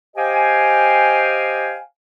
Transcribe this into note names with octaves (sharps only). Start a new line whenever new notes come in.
G4 C5 D#5 F5 G5 G#5